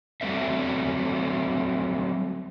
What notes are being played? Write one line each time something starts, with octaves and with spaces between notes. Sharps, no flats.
F#3 G3 A3 C4 B4 E5